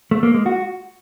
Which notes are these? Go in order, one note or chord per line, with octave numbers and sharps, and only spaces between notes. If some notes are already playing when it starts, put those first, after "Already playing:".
A3
A#3
G#3
F#4